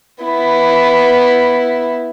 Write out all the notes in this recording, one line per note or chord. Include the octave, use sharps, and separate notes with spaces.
B3 E4